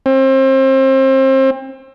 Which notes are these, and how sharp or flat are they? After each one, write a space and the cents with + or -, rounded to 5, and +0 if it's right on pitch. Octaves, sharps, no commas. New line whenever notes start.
C4 +30